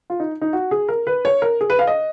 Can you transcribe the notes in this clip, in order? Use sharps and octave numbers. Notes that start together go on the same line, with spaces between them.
F4
D#4
D#4
F#4
G#4
A#4
B4
C#5
A#4
G#4
B4
F5
D#5